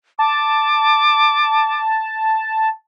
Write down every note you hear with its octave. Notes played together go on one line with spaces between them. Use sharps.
A5 D6